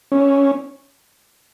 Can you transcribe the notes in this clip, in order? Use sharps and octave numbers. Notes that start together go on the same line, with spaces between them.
C#4